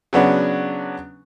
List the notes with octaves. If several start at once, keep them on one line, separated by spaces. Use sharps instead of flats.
C#3 F#3 B3 D4